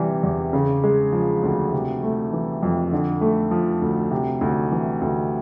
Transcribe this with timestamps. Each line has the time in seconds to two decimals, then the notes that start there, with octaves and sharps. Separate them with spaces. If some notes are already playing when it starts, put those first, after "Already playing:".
Already playing: C3 E3 G3
0.23 E2
0.53 C#3
0.84 G#3
1.12 F3
1.43 D2
1.73 C3
2.03 A3
2.33 E3
2.63 F2
2.93 D3
3.21 A3
3.51 F3
3.82 D2
4.11 C3
4.41 D2
4.72 E3
5.02 D2